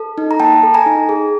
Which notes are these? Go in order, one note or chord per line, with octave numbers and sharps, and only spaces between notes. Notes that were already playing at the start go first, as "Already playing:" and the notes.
Already playing: A4
D#4
A#5
A#3 G5 A5
A4
G#5 A#5
D#4
G#4